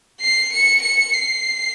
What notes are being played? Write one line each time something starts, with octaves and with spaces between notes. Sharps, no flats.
C7
C#7
C#7
C7